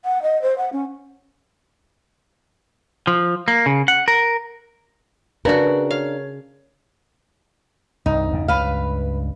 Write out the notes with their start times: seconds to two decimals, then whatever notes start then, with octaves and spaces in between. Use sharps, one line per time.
0.05 F#5
0.22 D#5
0.42 C5
0.58 F#5
0.73 C#4
3.07 F3
3.48 A#3
3.66 C#3
3.88 F#5
4.08 A#4
5.45 C#3 D4 F#4 A#4 B4
5.91 C#5 F5
8.06 C2 G2 D#4
8.31 E2 G2 C#3
8.48 C#2 G2 B4 F5